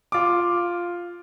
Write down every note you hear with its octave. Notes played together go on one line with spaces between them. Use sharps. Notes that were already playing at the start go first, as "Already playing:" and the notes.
F4 D6